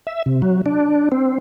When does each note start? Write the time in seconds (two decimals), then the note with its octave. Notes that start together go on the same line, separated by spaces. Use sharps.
0.07 E5
0.26 C3
0.42 F#3
0.66 D4
1.12 C4